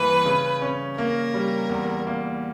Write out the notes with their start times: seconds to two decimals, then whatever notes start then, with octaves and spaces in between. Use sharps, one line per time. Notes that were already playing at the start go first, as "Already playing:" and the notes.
Already playing: G2 E3 A#3 E4 B4
0.25 C#3
0.62 C#4
0.98 A#3 A#4
1.34 G3
1.69 E2
2.07 A#3